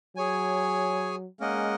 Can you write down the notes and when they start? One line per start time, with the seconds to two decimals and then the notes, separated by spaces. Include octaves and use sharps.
0.15 F#3 G#4 C#5 G#5
1.40 G#3 A#3 C#4 A#4 D#5 F#5